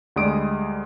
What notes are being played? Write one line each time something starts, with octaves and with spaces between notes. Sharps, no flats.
D2 G3 G#3 D5 D#6 D7